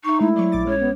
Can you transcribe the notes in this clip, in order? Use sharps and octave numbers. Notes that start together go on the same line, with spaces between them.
D#4 E5 C6 C#6
G#3 A3 E4
F#3 D5 C#6
A#1 D6 A6
G#3 C#4 C#5
B3